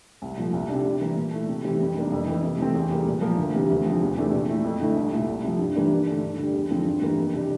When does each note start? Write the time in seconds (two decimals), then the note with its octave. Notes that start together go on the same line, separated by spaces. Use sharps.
0.22 C2
0.37 A#2 F3 A3
0.53 C2
0.69 C3 G3 D4
0.85 C3
1.01 E3 A#3
1.16 A#2
1.33 A3 E4
1.49 C3
1.65 E3 G3 C4
1.81 F2
1.95 C3 G3 A#3 D4
2.12 F2
2.27 E3 A#3
2.43 C3
2.59 E3 A3 C4
2.74 E2
2.90 C3 G3 A#3
3.06 A#2
3.22 F3 A#3
3.37 D2
3.54 C3 E3 G3 A#3
3.70 D2
3.86 C3 F3
4.01 E2
4.17 C3 E3 A3 D4
4.33 A#2
4.49 A3 E4
4.65 F2
4.81 D3 A3 E4
4.97 C2
5.12 A#2 A3 E4
5.27 C2
5.44 C3 F3
5.59 G2
5.75 E3 G3 A#3 D4
5.90 G2
6.07 D3 A3 D4
6.23 G2
6.38 D3 G3
6.54 E2
6.70 D3 F3 C4
6.86 G2
7.02 E3 G3 A#3
7.17 F2
7.33 C3 G3 D4